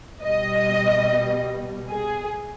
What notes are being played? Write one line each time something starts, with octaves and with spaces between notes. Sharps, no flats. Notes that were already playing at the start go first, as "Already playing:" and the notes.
B2 G3 D#5
G#4